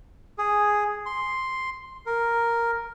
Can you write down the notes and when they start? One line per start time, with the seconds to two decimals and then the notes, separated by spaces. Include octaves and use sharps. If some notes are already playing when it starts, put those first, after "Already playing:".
0.38 G#4
1.06 C6
2.06 A#4